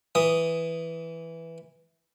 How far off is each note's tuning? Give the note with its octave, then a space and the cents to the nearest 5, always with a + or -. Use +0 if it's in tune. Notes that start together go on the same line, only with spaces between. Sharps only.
E3 +0 D#6 +0